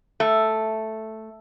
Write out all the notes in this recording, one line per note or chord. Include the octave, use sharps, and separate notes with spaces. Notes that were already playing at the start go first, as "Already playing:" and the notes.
A3